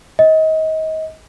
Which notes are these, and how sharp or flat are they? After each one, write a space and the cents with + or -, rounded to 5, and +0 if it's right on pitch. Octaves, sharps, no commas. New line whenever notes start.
D#5 +30